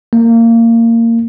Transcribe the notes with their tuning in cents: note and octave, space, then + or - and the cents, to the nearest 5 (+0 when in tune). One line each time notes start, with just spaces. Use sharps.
A#3 -20